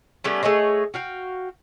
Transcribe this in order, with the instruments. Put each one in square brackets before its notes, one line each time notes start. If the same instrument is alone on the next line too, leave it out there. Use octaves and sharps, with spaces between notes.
[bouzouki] G3 A3 B3 C#4
A3 G#4 C#5 D#5
F#4 F5 G5